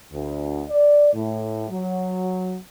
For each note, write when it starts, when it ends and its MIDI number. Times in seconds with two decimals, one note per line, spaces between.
0.12 0.62 38
0.68 1.12 74
1.14 1.67 45
1.69 2.57 54